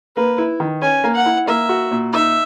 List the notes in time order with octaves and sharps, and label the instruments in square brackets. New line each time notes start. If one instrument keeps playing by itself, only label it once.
[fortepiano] A#3 [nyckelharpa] B4
[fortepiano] E4
D#3
[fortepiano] C#4 [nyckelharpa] G#5
[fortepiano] A#3
[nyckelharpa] F#5
[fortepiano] E4
[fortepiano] A#3 [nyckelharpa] E5
[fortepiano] F#4
A#2
[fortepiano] D#4 [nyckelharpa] E5